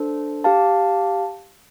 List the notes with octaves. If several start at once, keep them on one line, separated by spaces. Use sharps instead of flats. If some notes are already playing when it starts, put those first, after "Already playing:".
Already playing: D4 A4 C5
G4 F5 A5